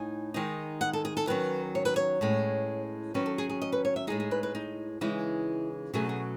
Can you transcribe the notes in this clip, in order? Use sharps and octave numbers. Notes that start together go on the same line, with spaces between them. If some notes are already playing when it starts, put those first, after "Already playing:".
Already playing: A2 D#4 G#5
D#3 G#3 D#4
F#5
A4
G#4
A4
D#3 F#3 C#4 B4
C#5
B4
C#5
A2 G#3 C#4
D#3 F#3 C#4 B4
A4
G#4
G#4
D#5
B4
C#5
E5
A2 G#3 D#4 G#4
G#4
B4
B4
D#4
C#3 E3 G#3 D#4 E4
B2 F#3 A3 C#4 G#4
G#4